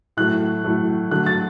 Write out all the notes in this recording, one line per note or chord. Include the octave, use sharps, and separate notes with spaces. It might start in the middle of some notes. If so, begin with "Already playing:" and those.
A2 F#3 A3 F#6
A2 F#3 A3
D3 F#3 A3 F#6
A6